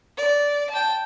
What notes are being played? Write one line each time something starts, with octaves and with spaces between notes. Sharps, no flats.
D5
G5 A5